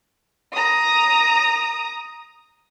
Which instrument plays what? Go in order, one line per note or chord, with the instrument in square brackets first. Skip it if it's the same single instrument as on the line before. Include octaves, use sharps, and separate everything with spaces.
[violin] A#5 D#6